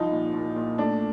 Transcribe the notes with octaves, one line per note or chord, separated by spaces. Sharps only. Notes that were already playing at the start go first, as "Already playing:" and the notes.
Already playing: C2 F3 D#4
A#2
A#2
A#2
A3 D4